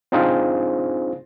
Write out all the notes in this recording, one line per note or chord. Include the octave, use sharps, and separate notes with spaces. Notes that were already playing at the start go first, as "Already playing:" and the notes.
C4 D4 D#4 F4 G#4 C5